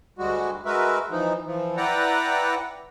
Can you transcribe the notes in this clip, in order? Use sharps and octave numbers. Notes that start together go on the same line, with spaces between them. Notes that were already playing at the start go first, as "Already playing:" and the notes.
D2 G3 G#3 F#4
G#3 F#4 A#4 B4 E5
E3 F3 D#4
E3 F3
E4 B4 D5 F#5 G5 A#5